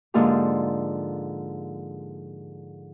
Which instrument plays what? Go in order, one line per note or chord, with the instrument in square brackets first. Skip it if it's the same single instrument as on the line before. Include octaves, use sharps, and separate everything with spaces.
[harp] G#2 D3 F3 A#3 F4 G4